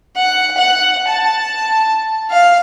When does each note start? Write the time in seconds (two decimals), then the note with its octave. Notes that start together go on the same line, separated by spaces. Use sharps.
0.16 F#5
0.57 F#5
1.08 A5
2.31 F5